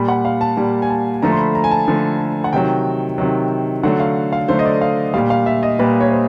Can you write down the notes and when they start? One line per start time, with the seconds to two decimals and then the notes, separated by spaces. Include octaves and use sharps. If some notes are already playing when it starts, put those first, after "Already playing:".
Already playing: A#2 G3 B5
0.08 F#5
0.25 F5
0.41 A5
0.57 A#2 G3 A5
0.82 G#5
0.90 A5
1.22 D3 F3 A3 A#5
1.32 C6
1.39 B5
1.55 A#5
1.64 G#5
1.71 A5
1.88 D3 F3 A3
2.44 F#5
2.53 C3 D#3 F#3 G5
3.18 C3 D#3 F#3
3.83 D3 F#3 A3 F#5
4.00 F5
4.33 F5
4.48 D3 F#3 A3 C5
4.59 D#5
4.65 D5
4.81 F5
5.14 A#2 G3 F5
5.30 F5
5.46 E5
5.63 D#5
5.79 A#2 G3 B4
6.01 C#5
6.11 C5